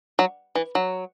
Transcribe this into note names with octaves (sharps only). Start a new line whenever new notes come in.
F#3
E3
F#3